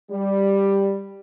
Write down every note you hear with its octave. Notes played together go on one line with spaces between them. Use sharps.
G3